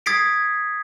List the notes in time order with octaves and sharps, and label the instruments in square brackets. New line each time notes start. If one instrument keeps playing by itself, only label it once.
[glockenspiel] D#6 G#6 A6 B6 C7 D7